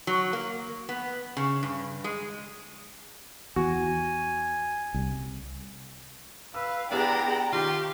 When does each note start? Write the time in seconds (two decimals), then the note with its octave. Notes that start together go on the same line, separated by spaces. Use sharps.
0.07 F#3
0.33 A#3
0.89 B3
1.37 C#3
1.63 G2
2.04 G#3
3.56 E2 F#4 G#5
4.94 C2
6.54 B4 F5 E6
6.91 B3 D4 E4 G4 G#4 G5 A#5
7.52 D#3 F4 G4